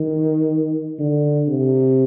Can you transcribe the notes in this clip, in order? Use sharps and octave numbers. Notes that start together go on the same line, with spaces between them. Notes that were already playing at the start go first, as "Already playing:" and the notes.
Already playing: D#3
D3
C3